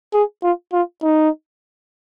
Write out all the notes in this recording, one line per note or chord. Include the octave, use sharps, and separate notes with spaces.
G#4
F4
F4
D#4